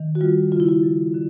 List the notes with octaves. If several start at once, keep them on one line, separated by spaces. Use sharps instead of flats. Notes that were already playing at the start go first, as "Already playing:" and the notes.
Already playing: D#3
F#4
G3 F4
C#3 F4
E4
F4
F3
D3